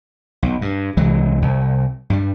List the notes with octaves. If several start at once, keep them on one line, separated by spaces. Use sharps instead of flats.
B1
G2
C2 E3 F#3 G#3
C2
G2 G3